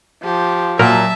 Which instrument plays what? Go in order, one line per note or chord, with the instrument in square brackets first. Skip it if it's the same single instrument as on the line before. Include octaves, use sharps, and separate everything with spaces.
[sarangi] F3 [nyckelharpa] G4
[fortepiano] A#2 [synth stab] F#3 A#4 [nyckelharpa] E5 A5